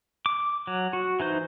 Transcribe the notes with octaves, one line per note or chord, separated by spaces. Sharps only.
D6
F#3
F#4
E3 D#4 C5